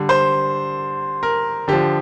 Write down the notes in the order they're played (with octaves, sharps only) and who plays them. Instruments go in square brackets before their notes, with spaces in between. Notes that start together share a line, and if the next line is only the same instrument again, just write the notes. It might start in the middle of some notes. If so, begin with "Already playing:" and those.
Already playing: [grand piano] D3 G3
C5
A#4
D3 F3 G4